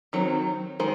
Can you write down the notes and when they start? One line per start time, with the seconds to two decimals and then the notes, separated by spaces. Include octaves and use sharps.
0.13 D#3 F#3 C4
0.80 D#3 G#3 C5